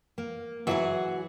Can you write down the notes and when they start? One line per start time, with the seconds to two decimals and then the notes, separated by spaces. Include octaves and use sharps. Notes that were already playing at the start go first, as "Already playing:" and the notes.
0.18 A#3
0.67 E3 F#3 F#4 G#4 F#5